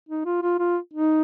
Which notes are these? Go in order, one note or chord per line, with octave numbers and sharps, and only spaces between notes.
D#4
F4
F4
F4
D#4